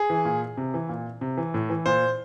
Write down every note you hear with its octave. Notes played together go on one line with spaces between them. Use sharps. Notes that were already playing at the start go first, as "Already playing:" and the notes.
Already playing: G#4
E3
A#2
C3
E3
A#2
C3
E3
A2
E3
A#2 C5